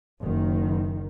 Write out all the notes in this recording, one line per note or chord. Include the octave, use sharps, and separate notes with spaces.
F#1 D#3